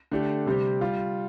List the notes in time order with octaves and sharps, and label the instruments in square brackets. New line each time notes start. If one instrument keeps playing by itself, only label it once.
[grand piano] D3 A3 D4 G4
C3 G3 C4 G4
G3 F4